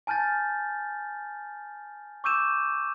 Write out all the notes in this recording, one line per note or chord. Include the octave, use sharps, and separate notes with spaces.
G#5 A5 F6 G6 A6
C#6 D6 E6 G6 D#7 E7